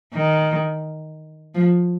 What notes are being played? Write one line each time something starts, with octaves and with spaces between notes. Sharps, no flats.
D#3
F3